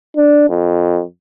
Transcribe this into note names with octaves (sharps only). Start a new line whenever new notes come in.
D4
F2